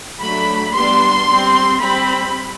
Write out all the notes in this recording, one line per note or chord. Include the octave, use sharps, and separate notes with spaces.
F#3 A3 D4 B5
G3 B3 D4 C6
G3 C4
G3 C4 B5